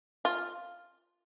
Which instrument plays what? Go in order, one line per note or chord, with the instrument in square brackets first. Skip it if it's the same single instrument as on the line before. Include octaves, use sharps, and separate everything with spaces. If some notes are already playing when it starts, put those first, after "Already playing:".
[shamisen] F4